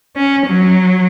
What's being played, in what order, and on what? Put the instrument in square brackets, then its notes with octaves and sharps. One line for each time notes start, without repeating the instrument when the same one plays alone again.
[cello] C#4
F#3